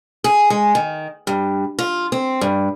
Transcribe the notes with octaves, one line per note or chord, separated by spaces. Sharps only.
G#4
G#3
D#3
G2
F4
C4
G2